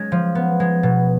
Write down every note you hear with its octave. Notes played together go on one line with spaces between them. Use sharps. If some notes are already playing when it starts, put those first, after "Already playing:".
Already playing: G#3 C#4
F3
B3
G#3
B2